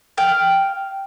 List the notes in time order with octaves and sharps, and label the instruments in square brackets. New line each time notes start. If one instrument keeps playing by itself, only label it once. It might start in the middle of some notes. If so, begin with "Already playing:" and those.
[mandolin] F5 G5